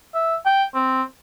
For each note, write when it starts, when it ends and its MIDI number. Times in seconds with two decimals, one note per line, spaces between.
0.14 0.36 76
0.46 0.64 79
0.75 1.03 60